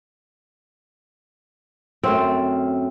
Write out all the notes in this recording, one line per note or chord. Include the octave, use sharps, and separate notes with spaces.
F#2 A3 C4